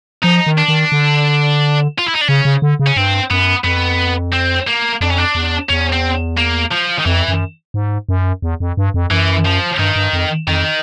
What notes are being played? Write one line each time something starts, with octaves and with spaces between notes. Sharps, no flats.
F3 D#4
D#3
D4
D#3
D3
F4
E4
D#4
D4
C#3 C#4
C#3
D3
C#3
C#4
G2 C4
F#2 B3
F2 B3
C4
A#3
F2 D4
C#4
D4
E2
E2 C#4
C4
A#3
F3
D#3
F2 E3
F#2
G#2
F#2
E2
F2
G2
F2
F#2 E3
F3
G2 D#3
G2
F2
F2 D#3